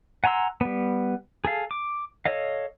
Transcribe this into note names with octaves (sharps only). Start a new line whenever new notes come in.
F#5 G#5 A#5 C6 E6
G3 B3
G#4 A4 F5
D6
A4 C#5 D#5 F5